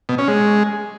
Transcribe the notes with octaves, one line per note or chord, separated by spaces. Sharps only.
B2
C#4
G#3